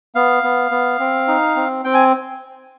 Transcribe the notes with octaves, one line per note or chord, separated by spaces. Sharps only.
B3 F5
B3
B3
C4
D#4
C4
C4 G5
G#5